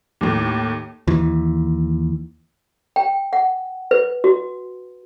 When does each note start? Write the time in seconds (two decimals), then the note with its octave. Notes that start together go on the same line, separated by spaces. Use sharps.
0.21 D#2 A2
1.07 D#2 E3
2.96 G5
3.33 F#5
3.91 B4
4.24 F#4